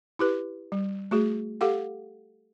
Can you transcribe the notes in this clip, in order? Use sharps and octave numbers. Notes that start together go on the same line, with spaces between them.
E4 G4 B4
G3
A3 F#4 G#4
G4 A4 F5 F#5